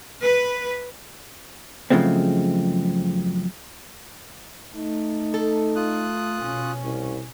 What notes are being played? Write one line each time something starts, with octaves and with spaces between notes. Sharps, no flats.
B4
F#2 C#3 F3 G#3 A3 C4
A3 D#4
A4
F4 D#6 F#6
B2 C#4
C2